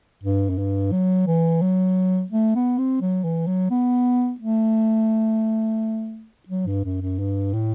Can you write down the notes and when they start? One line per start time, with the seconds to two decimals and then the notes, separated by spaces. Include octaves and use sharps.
0.23 G2
0.50 F#2
0.58 G2
0.92 F#3
1.27 E3
1.61 F#3
2.31 A3
2.55 B3
2.78 C4
3.01 F#3
3.24 E3
3.47 F#3
3.71 B3
4.40 A3
6.48 F#3
6.67 G2
6.84 F#2
7.01 F#2
7.19 G2
7.53 A2